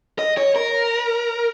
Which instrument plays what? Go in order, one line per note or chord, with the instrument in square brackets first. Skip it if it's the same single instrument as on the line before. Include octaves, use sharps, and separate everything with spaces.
[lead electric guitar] D#5
C#5
A#4